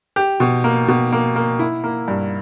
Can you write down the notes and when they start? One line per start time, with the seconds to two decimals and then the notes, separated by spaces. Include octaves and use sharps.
0.16 G4
0.40 B2
0.64 A#3
0.88 B2
1.12 A#3
1.36 A#3
1.59 E4
1.84 A#3
2.08 G2